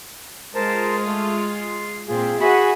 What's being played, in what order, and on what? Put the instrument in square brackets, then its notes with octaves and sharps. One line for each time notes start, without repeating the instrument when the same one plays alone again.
[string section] G#3 F4 [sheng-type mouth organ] A#4 C5 A5
[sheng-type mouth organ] A3
C6
[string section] A#2 C4 [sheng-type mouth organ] F4 G#4
[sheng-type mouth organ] F#4 G#4 B5 [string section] E5 F#5 G#5